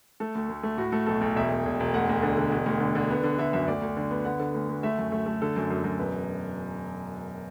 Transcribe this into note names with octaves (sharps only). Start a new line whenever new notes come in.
A3 A4
D2
D2
A3
A2 F#4
A3 A4
B1 A4
B1
E1 E5
E1
E1
E1
D2 F#5
D2
D3
D3
E1
D2
D3
D3
B3
D3
D3 E5
F#2 E5
D2 D5
D2
D3
B3
D3 F#5
D3
D2
D2
A3 E5
F#2
A3
A3
D3 A4
F#2
F#2
F#2
E1 B4